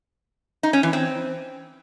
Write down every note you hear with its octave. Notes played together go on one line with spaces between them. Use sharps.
D#4
C#4
E3
C4